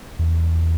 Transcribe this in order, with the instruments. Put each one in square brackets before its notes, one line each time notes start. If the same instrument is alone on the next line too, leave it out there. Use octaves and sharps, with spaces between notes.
[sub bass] E2